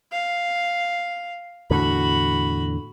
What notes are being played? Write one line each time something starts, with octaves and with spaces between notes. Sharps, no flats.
F5
E2 A2 D3 F#4 B5